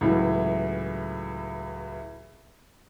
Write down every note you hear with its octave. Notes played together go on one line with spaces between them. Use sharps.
C#2 A2 E3 F#3